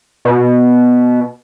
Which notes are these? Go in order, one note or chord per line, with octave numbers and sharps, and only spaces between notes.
B2